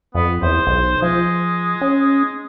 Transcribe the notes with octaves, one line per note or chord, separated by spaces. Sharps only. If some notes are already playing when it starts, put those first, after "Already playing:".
F2 B3
E2 C5
B1
F3 G#3
C#4